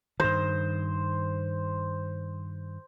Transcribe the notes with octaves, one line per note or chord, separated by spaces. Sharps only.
G2 D#3 C5